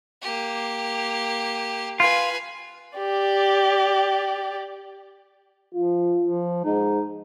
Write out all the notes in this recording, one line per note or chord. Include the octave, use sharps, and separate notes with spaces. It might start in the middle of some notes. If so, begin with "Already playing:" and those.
A#3 G4
F4 B4 G#5
G4 D5
F3 F4
F3
G#2 D#4